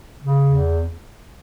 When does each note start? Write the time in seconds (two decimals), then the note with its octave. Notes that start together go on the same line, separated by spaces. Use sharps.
0.23 C#3
0.46 E2